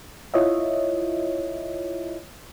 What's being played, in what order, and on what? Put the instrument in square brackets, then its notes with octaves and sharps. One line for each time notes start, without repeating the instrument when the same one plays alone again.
[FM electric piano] E4 F4 C#5 D#5 E5